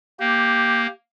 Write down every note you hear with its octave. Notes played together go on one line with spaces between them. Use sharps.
A#3 G4